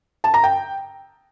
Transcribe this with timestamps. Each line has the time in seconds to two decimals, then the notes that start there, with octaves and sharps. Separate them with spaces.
0.24 A5
0.34 A#5
0.44 G5